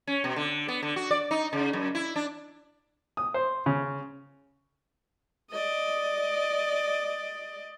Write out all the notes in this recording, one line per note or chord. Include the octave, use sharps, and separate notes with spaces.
C#4
B2
D3
B3
D3
F#4
D5
D#4
C#3
F#2
E4
D4
D#6
C5
C#3
D5 D#5